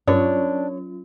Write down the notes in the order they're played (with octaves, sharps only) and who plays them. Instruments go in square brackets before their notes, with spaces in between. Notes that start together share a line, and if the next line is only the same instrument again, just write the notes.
[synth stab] G2 [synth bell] F#3 C#4 F4 [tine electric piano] D4 [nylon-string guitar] C#5